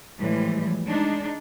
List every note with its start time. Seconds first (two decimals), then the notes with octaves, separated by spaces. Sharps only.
0.19 A2 E3 F3 G3 G#3
0.87 G#3 D4 D#4